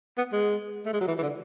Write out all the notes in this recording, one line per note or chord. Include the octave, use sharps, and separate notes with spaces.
B3
G#3
A3
G#3
F#3
E3
E3
D3